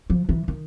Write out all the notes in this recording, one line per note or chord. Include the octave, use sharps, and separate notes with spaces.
F3
E3
D#3